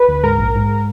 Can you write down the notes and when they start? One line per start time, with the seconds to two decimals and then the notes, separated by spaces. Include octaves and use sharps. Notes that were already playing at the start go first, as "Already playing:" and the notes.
Already playing: B4
0.08 D2
0.23 G#2 A#4
0.39 A#1
0.55 G#2